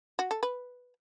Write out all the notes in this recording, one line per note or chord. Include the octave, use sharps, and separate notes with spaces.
F#4
A4
B4